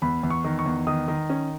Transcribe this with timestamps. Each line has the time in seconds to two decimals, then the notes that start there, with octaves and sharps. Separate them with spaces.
0.02 E2 B5
0.23 E2
0.30 C#6
0.44 D#3
0.59 C#6
0.66 E2
0.87 D#3 D#6
1.08 D#3
1.30 C#4